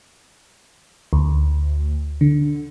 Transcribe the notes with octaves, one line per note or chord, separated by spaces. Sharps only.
D2
D3